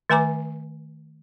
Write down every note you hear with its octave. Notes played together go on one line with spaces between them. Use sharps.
D#3 A3 B4 G#5 A#5 D6